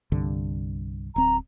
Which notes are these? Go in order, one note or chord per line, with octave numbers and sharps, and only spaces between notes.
C2 G2 D3
D1 C4 A#5